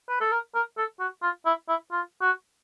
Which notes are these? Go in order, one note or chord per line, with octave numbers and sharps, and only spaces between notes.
B4
A4
A#4
A#4
A4
F#4
F4
E4
E4
F4
F#4